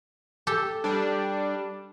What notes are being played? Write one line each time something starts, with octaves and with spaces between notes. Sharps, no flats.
G4 A4
G3 D4